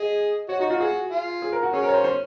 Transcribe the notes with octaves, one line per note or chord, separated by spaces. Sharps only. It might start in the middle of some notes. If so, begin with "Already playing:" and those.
Already playing: G#4 D#5
F#4 C#5
D#4 F#4
F4 F#4
F#4 G#4
F4
G#4
A#4
F#4
C#4 G#4
A#4
C#5
C5
C5